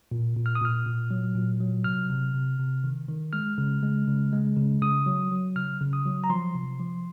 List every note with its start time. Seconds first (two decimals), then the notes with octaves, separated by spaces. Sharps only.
0.11 A#2
0.36 A#2
0.46 F6
0.55 D#6
0.61 A#2 F6
0.86 A#2
1.11 F#3
1.35 A#2
1.60 F#3
1.84 C3 F6
2.10 C3
2.34 C3
2.59 C3
2.84 D#3
3.08 D#3
3.33 G#3 F6
3.58 C#3
3.83 G#3
4.07 C#3
4.33 G#3
4.57 C#3
4.82 C#3 D#6
5.06 F#3
5.32 F#3
5.56 C#3 F6
5.81 C#3
5.93 D#6
6.05 F#3
6.24 A#5
6.30 F3 C6
6.55 C3
6.80 F3